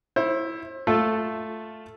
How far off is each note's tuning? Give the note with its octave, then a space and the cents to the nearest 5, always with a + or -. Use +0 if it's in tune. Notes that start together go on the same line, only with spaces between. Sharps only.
E4 +0 C5 +35
A3 +0 F4 +0 A4 +0